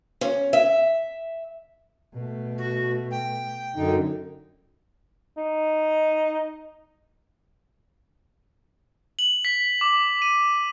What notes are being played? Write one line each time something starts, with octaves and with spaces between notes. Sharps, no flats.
C#4
E5
B2 A3
F#4
G5
F#2 D3 D#4
D#4
F#7
B6
D6
D#7